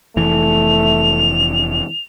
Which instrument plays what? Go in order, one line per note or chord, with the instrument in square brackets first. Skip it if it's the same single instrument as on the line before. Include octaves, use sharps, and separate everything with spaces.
[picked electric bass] F1 E3 [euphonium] A3 [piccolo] F7